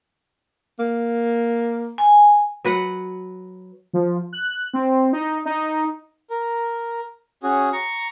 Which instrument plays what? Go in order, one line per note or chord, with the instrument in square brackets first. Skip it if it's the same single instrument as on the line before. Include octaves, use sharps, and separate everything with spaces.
[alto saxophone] A#3
[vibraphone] G#5
[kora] F#3 B4 F#5
[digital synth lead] F3
F#6
C4
D#4
D#4
[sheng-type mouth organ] A#4
C#4 F#4 G#4
A#5 C#6